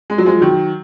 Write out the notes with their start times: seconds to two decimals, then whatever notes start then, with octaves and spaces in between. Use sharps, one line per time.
0.10 G#3
0.18 F#3
0.26 F3 G#3
0.41 D#3 F#3